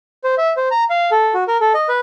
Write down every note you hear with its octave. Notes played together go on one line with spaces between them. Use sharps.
C5
E5
C5
A#5
F5
A4
F#4
A#4
A4
D#5
B4